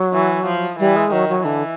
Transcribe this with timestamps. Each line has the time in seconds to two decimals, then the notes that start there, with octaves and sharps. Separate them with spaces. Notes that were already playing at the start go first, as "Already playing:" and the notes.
Already playing: F#3
0.13 E3
0.47 F3
0.79 E3 G3
0.96 G#3
1.12 D#3 F#3
1.29 F#3
1.45 D3 E3